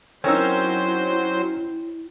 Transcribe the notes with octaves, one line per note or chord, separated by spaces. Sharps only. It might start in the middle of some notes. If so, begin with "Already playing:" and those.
F#3 C4 C#4 D#4 E4 A#4 C5 E6